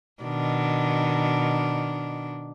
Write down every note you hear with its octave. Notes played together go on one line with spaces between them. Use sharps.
B2 D#3 D4